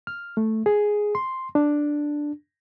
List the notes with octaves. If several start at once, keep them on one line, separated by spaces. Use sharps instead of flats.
F6
A3
G#4
C6
D4